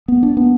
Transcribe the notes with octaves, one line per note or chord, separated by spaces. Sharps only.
B3
D4
B3